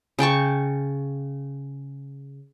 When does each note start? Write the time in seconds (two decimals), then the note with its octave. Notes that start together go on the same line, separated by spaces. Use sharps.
0.19 C#3 G5 A5 C#6